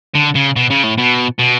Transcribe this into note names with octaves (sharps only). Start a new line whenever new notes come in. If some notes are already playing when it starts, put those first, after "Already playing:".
D3
C#3
B2
C#3
A2
B2
B2